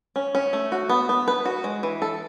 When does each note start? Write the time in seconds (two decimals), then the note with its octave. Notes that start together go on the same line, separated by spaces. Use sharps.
0.16 C#4
0.35 C#4
0.53 A3
0.72 F#4
0.90 B3
1.09 B3
1.28 B4
1.45 F#4
1.64 G#3
1.83 E3
2.02 A4